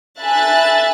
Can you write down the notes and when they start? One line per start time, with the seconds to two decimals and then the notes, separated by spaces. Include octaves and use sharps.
0.20 A4 E5 G#5 B5 F#6 A6